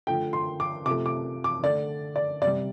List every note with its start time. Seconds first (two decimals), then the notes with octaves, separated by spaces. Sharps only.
0.07 D3 F3 A3 G5
0.33 C6
0.60 D6
0.85 C3 F3 A3 D6
1.06 D6
1.44 D6
1.63 D3 A3 D5
2.16 D5
2.42 C3 D5
2.46 G3